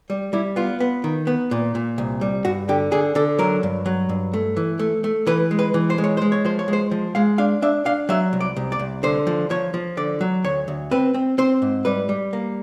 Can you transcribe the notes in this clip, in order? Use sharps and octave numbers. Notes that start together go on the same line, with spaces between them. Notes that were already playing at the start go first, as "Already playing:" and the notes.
G3
G3 E4
B3 F4
B3
D#3
B3
A#2
A#2
C2
G3
G2 F#4
D3 G4
D3 G#4
D3 A4
F#3 A#4
G2
F#3
G2
A3
E3
A3
A3
E3 B4
G#3
B4
E3
C5
G#3
C#5
G#3 C5
C#5
F3 C5
C#5
G#3
C5
F3
G#3 F5
D4 F5
D4 E5
D4 F5
F#3 E5
C2
D5
C2
D5
C2
D3 C5
F3
F3 C#5
F3
D3 D5
F#3
D2 C#5
D2
C4 B4
C4
C4 C5
G#2
G3 B4
G3
A#3